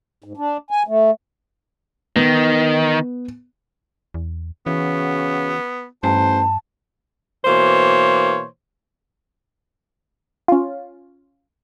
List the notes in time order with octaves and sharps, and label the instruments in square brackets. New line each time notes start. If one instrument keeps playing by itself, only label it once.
[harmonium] G#2
D4
G#5
A3
[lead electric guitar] D#3 [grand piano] B3
[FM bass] E2
[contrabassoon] C#3 [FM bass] E3 [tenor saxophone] B3 [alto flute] F#4
[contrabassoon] A1 [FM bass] G2 [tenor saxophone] C5 [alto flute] A5
[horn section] B2 E3 A#3 C5 C#5
[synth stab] C#4 F4